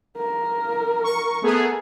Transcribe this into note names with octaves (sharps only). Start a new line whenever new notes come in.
A#4
C#6
A3 B3 G#4